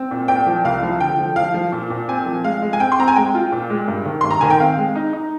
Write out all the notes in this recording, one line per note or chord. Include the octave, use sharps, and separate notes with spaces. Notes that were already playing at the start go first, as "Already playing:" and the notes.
Already playing: C4
A#2
A#2 G5
F3
C2 F5
F3
D3 G5
F3
F3 F5
F3
A#2
A#2
C4 G#5
F3
G#3 F5
G#3
G#5
C4 G5
C6
C4 A#5
G#5
G#3 G5
F4
A#2
G#3
G2
D#3
G2 C6
A#5
D#3 G#5
G5
C4 F5
G#3
D#4
D#4